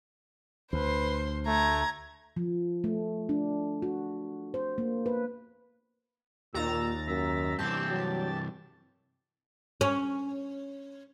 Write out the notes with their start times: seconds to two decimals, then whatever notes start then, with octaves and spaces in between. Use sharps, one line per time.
0.73 D2 B4 C5 C6
1.47 A3 A#5 G#6
2.36 F3
2.84 A3
3.29 D4
3.82 F#4
4.54 C5
4.78 A#3
5.06 B4
6.54 D#2 A#2 A#5 E6 A6
7.08 F#2 E5
7.59 G2 C3 E3 C4 G4 A5
7.89 F#3
8.20 D5
9.81 C#4